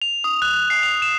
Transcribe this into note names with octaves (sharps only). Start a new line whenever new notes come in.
F7
D#6
F#6
F#6
C7
F7
E7